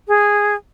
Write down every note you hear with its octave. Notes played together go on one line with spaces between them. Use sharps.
G#4